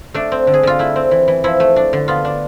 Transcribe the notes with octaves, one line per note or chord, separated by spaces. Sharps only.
A3 D4
C4
D3
G#4
D3 F4
A3 E4
C4
E3
E3
F3 E4
A3
D4
D3
B3 F4
D4